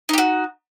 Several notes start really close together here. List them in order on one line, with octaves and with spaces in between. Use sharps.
D#4 G4 F#4